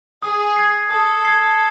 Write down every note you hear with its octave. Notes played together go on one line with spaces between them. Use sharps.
G#4 D#6
G#6 C7
A4 D#6
G#6 C7